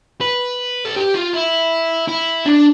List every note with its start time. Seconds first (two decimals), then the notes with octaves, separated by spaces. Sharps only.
0.21 B4
0.85 A4
0.96 G4
1.14 F4
1.33 E4
2.08 E4
2.46 D4